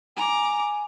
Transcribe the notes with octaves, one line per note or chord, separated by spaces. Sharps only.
G#5 A#5 D6